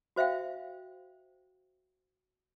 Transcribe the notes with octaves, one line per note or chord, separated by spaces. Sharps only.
F#4 C5 E5 F5 G5